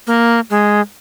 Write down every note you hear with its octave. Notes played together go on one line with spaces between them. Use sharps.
A#3
G#3